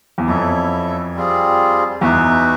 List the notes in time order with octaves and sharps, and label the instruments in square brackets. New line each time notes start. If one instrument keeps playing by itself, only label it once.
[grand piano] E2
[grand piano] F2 [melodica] E4 A4 C#5 E5
[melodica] G3 C4 F4 G#4
[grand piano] E2 [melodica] D#4 F#4 B4 E5